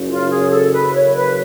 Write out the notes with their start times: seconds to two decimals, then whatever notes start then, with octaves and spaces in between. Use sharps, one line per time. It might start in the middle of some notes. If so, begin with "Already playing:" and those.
Already playing: F#1 F#2 C#3
0.09 F4
0.30 G#4
0.51 A4
0.72 B4
0.94 C#5
1.16 B4